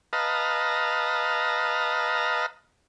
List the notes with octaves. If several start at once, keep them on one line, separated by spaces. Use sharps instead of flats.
B4 D#5 F5 A5 A#5